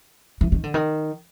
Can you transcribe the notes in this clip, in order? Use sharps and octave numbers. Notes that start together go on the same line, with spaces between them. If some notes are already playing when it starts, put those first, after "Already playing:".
E3
D#3
D3
D#3